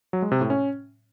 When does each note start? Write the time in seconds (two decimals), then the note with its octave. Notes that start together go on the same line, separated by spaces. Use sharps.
0.13 F#3
0.22 G#3
0.32 C3
0.41 A2
0.50 C#4